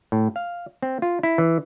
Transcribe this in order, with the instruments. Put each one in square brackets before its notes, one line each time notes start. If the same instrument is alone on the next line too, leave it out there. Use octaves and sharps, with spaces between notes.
[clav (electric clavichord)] A2
F5
C4
F4
E4
E3